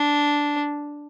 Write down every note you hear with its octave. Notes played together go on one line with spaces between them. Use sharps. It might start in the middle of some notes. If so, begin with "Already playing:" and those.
Already playing: D4